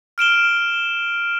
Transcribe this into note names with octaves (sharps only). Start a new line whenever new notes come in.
F6 D7 E7 G7